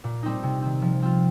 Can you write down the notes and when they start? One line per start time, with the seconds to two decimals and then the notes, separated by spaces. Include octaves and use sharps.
0.04 A#2
0.23 G3 C4 D#4
0.43 C3
0.62 D#3 C4
0.82 F3
1.02 C4 F4